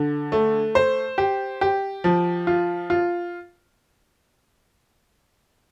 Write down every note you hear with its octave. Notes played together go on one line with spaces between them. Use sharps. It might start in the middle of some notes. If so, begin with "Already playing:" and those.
Already playing: D3
A3
C5
G4
G4
F3
F4
F4